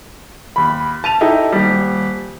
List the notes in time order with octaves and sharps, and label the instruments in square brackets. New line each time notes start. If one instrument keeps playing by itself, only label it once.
[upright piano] D#2 B5
A5 D#7 F7
D#4 E4 G4 A4
D#1 G3